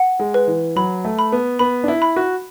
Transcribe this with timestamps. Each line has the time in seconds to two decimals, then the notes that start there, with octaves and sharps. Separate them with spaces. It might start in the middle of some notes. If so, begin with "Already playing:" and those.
Already playing: F#5
0.20 G#3
0.34 B4
0.47 E3
0.76 F#3 B5
1.05 A3
1.19 B5
1.32 B3
1.59 B3 B5
1.84 D4
1.88 E4
2.02 B5
2.16 F#4